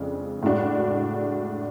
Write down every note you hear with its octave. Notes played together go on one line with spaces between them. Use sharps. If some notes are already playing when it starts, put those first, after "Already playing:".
Already playing: F2 C#3 G#3 D4
A2 G#3 D4 F#4